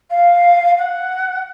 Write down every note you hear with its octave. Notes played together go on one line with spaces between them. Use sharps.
F5
F#5